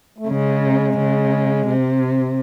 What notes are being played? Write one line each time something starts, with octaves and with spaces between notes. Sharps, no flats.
A3
C#3 G#3
C#3
C3